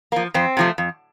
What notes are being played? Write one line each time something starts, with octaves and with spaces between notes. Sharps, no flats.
F3 A#3
F2 C4
C3 F3 A3
F2